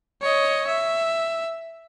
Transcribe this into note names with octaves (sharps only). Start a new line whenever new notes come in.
C#5 D#5
E5